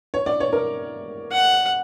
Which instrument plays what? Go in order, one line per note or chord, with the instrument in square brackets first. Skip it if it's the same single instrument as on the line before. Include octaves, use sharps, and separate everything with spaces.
[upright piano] C#5
D5
C#5
A#4
[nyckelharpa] F#5